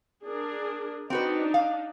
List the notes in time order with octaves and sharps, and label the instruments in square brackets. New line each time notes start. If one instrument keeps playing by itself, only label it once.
[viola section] D4 G#4 A#4
[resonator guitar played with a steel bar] C4 F#4 B4 [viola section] D4 D#4
[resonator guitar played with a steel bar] F5